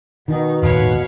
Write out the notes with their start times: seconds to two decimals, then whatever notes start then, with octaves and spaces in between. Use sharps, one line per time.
0.28 B2 D#3 D#4
0.62 D#1 G#1 A2 B4 C#5 F5